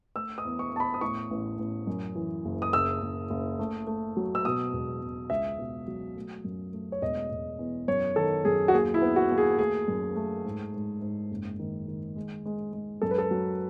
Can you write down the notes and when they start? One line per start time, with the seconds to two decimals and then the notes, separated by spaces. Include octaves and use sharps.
0.16 A3 E6
0.38 D#6
0.45 E2
0.59 C#6
0.72 E2 A5
0.80 B5
0.94 D#6
1.01 A2 C#6
1.30 A1
1.59 A1
1.87 F#2
2.16 E3
2.45 F#1
2.62 D#6
2.73 F#1 E6
3.02 F#1
3.30 F#1
3.59 A3
3.87 A3
4.17 F#3
4.35 E6
4.45 B2 D#6
4.73 E1
5.02 E1
5.30 C#2 E5
5.58 B2
5.88 F#3
6.16 A3
6.44 F#2
6.73 A3
6.92 C#5
7.02 E1 D#5
7.31 E1
7.59 E2
7.88 F#2 C#5
8.16 D#3 A4
8.45 F#2 G#4
8.68 F#4
8.74 D#2 G#4
8.94 E4
9.02 B3
9.16 F#4
9.31 D#2
9.38 G#4
9.59 A3 G#4
9.88 F#2
10.16 A3
10.45 G#2
10.74 G#2
11.02 G#2
11.31 F#1
11.59 D#3
11.88 D#3
12.16 G#3
12.46 G#3
12.73 G#3
13.02 F#2 A4
13.11 B4
13.18 A4
13.31 F#3